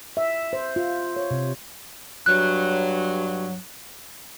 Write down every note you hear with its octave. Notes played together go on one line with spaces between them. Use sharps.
E5
C5
F4
C#5
C3
G2 F#3 F#6